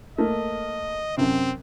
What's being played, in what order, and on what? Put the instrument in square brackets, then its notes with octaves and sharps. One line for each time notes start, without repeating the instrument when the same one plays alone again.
[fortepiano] A3 A#3 [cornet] D#5
[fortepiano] F#2 C3 [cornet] C4